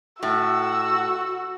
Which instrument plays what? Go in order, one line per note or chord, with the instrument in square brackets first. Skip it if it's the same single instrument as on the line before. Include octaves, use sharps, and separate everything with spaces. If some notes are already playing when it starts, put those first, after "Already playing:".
[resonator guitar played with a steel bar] A2 [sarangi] F#4 [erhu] E6